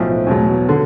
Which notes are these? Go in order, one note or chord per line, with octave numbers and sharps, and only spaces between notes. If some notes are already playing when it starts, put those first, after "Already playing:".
Already playing: B1 A2 F3
E2 B2 F#3
D3